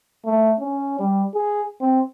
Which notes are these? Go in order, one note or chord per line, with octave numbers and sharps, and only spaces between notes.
A3
C#4
G3
G#4
C4